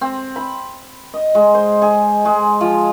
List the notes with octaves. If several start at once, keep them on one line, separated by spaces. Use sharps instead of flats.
C4
B5
D#5
G#3
C5
G#4
G#3
F3